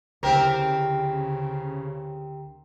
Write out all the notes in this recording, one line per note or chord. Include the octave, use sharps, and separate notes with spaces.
D2 C#3 C4 E4 G4 A#4